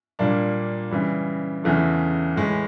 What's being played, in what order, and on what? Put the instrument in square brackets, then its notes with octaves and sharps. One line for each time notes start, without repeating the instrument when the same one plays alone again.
[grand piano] A#2 G3 A#3 D4
C#3 E3 G3
E2 C#3 E3 A3
A2 E3 G#3